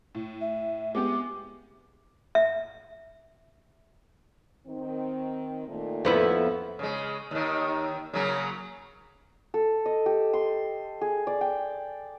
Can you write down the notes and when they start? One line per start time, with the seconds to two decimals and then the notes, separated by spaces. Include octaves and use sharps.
0.15 A2
0.41 E5
0.95 G#3 B3 G4 D6
2.35 E5
4.67 D#3 C4
5.69 A#2 D#3 A3
6.05 F2 B3 E4
6.79 C#3 G#3
7.31 D#2 D#3
8.13 C#3 F#3 A#3
9.54 A4
9.86 D#5
10.06 G4
10.33 C6
11.01 G#4
11.27 D5
11.41 G5